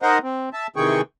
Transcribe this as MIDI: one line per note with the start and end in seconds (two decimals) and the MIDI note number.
0.02 0.18 63
0.02 0.18 70
0.02 0.18 72
0.02 0.18 75
0.02 0.18 78
0.02 0.18 82
0.23 0.49 60
0.53 0.67 76
0.53 0.67 81
0.76 1.01 48
0.76 1.01 51
0.76 1.01 52
0.76 1.01 68
0.76 1.01 79
0.76 1.01 85